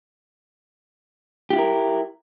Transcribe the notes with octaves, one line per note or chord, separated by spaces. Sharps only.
E4 F4 G4 A#4